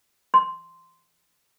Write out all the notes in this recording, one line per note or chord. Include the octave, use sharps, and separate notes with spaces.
C6